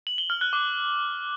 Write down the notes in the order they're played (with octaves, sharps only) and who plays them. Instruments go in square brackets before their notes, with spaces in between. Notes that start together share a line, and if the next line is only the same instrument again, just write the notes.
[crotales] F#7
G7
F6
F#6
D6